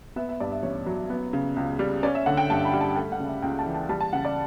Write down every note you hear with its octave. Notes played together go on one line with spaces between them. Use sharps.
B3 E5
E5
G2 D5
E5
A1 C#5
F#3
B3
C#3
C#2
G3
C#4 D5
E5
D3 F#5
G5
G2 A5
B5
G3
A5
A3 G5
F#5
C#3
E5
C#2 G5
A5
E3
A5
G3 A5
A5
C#3 F#5
D5